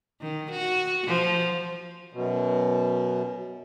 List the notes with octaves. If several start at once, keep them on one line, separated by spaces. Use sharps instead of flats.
D#3
F#4
F3
F#2 B2